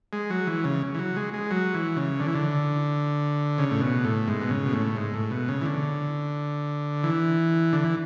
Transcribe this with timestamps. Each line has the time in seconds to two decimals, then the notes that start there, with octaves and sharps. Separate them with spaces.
0.13 G#3
0.30 F#3
0.47 E3
0.64 C#3
0.94 E3
0.99 F#3
1.16 G#3
1.34 G#3
1.51 F#3
1.74 E3
1.97 C#3
2.20 D3
2.27 E3
2.35 D3
3.58 C#3
3.71 A2
3.81 B2
4.04 A2
4.27 G#2
4.41 B2
4.50 C#3
4.65 B2
4.73 A2
4.96 G#2
5.14 A2
5.31 B2
5.48 C#3
5.61 E3
5.65 D3
7.03 E3
7.73 D3
7.84 E3